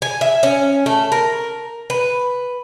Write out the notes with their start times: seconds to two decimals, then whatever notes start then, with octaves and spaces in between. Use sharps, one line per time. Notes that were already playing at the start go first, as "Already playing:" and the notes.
0.02 G#5
0.21 E5
0.43 C#4
0.86 A3
1.12 A#4
1.90 B4